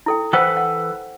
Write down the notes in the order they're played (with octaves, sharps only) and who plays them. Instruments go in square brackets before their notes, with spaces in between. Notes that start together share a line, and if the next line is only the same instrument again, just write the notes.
[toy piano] E4 A4 G5
[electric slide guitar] E3 A4 B4 [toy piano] C5 F#5 G5
[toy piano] F#5